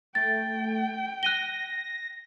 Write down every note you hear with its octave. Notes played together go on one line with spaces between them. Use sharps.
A3 G5 A6
F#6 A#6 D#7 G7